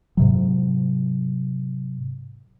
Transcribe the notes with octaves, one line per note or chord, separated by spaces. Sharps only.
G#2 C3 F#3